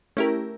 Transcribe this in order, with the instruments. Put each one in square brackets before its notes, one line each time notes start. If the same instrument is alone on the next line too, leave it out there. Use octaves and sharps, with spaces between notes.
[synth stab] A3 C#4 E4 G4 A#4